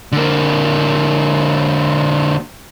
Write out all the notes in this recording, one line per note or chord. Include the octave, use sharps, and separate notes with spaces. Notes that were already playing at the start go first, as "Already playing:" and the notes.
D3 A#3